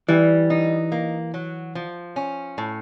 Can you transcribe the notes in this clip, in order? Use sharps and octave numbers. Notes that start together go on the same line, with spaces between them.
E3 G3
D#4
A#3
F#3
F3
C#4
A2